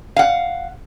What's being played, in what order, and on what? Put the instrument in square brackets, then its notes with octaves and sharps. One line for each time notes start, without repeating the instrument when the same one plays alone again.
[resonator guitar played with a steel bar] F5 F#5